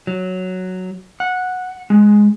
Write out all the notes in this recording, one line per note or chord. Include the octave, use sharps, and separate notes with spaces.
F#3
F#5
G#3